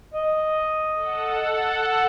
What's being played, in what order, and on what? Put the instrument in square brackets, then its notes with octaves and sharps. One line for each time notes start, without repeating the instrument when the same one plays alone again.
[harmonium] D#5
[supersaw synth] A4 F#5